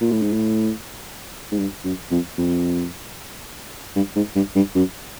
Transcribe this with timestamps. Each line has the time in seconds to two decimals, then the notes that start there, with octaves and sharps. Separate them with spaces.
0.01 A#2
0.11 A2
0.22 G#2
0.33 A2
1.52 G#2
1.59 G2
1.85 F#2
2.11 F2
2.38 F2
3.95 G2
4.16 G#2
4.35 G2
4.55 G2
4.75 F#2